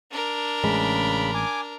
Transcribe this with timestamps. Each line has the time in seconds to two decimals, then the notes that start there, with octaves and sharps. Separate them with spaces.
0.12 D4 A#4
0.64 A1 C#3 G#3 B5
1.34 G#5 D6